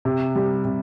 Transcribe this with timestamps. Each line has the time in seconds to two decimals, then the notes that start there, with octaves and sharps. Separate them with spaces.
0.05 C3
0.36 G3
0.65 C3